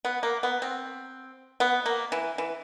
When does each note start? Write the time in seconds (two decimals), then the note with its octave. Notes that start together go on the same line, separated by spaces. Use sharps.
0.05 B3
0.23 A#3
0.43 B3
0.62 C4
1.60 B3
1.86 A#3
2.12 E3
2.38 E3